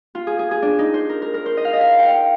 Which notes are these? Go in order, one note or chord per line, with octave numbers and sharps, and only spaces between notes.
F4
G#4
G#4
G#4
D4
D#4
C5
A#4
A#4
A#4
C5
D#5
F5
D#5
F5
G5
F5